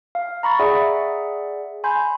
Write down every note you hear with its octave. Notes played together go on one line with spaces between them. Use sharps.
F5
A#5 B5 C#6 A6
G#4 D5 E5 F#5
G#5 B5 C6 G6